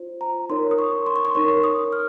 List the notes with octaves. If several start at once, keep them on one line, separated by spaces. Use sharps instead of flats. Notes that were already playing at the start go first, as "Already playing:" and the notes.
Already playing: F4 C5
A#5
D#4 A#4 C#5 C6
D#6
C#6
C6
C#6
C6
D#4 A#4 C#5 C#6
D#6
F6